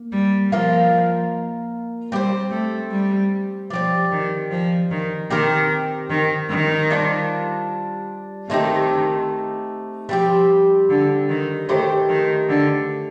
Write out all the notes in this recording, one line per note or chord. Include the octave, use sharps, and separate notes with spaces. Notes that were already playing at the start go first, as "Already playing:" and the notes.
Already playing: A#3
G3
F3 A#3 F4 A#4 D#5
G3 C4 G4 C5
A3
G3
F3 C4 G4 D5
D#3
F3
D#3
D#3 C4 G4 A#4
D#3
D#3
G3 D4 F4 C5
D#3 A3 C4 D#4 G4
F3 G3 C4 G4
D3
D#3
D#3 A3 D#4 G4 C5
D#3
D3